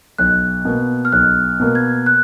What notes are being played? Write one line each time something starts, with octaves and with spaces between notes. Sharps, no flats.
B1 F#6
B2 A#3
F6
B1 F#6
B2 A#3
G#6
F#6